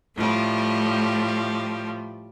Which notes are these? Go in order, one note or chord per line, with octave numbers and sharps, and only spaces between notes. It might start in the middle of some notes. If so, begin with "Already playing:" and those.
A2 F3 G3